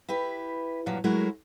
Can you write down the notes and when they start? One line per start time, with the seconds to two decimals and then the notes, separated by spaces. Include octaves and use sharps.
0.08 E4 G4 B4
0.86 G2 A#2 F3 F#3
1.04 F#3 G#3 A3 E4 F#4 A#4